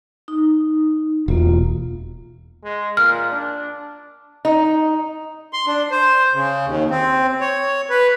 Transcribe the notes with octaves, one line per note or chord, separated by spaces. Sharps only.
D#4
E1 A#3 F4
G#3
A#2 F6
D4
D#4
C6
D4
C5
C#3
D#2
C4
C#5
B4